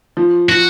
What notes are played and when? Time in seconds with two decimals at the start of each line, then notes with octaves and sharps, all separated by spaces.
0.17 F3
0.49 F3 F#4